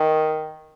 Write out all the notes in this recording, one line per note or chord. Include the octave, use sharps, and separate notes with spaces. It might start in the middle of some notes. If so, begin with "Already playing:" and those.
Already playing: D#3